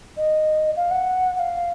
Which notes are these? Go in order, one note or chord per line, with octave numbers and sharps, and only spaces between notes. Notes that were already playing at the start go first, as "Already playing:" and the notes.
D#5
F5
F#5
F#5
F5